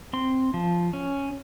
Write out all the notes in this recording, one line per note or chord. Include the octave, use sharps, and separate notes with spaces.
C4 C6
F3
C#4